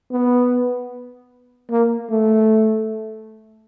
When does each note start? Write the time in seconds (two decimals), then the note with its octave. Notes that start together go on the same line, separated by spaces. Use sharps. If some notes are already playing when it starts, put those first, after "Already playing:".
0.12 B3
1.70 A#3
2.10 A3